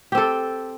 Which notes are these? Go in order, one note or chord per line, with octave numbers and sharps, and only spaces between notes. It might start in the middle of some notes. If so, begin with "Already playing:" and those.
C4 G4 A4